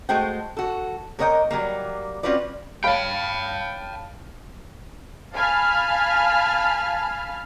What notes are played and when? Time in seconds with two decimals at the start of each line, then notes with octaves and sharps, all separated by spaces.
0.09 G#3 A3 F#4 C5 G5
0.57 F#4 A4
1.19 A#3 A#4 C#5 D#5 F5 G5
1.51 F#3 G3 A#3
2.23 C4 C#4 F4 F#4 B4 D5
2.84 C#5 F5 G5 A5 B5
5.34 F5 G#5 A5 B5 F6